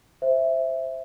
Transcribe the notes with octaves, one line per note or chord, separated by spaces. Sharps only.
C5 E5